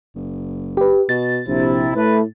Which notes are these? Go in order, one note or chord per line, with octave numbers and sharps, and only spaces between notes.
F#1
G4 B4
B2 A6
A#1 C3 E4
A2 A3 B4